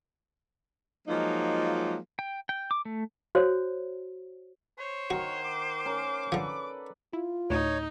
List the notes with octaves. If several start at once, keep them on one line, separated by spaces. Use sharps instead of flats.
F3 F#3 G#3 A#3 D#4 F4
G5
G5
D6
A3
F#4 C5 C#5
C5 C#5
D#3 F#4 A#4 F#5
D6
C#4 A#4
D3 F3 A4 B4 D5
E4 F4
D2 A2 D#4 C#5